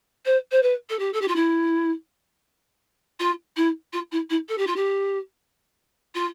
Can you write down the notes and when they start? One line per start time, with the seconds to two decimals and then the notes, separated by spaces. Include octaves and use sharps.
0.25 C5
0.51 C5
0.62 B4
0.89 A4
0.99 G4
1.13 A4
1.21 G4
1.28 F4
1.35 E4
3.19 F4
3.56 E4
3.93 F4
4.12 E4
4.30 E4
4.48 A4
4.58 G4
4.67 F4
4.76 G4
6.15 F4